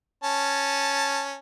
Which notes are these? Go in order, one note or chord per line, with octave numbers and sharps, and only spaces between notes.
C#4 A5